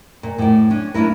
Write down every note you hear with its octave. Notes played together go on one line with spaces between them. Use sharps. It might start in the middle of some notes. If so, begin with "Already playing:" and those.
A#2
A2 D5
C#4 D4
A#3 C#4 D4 E4 A#4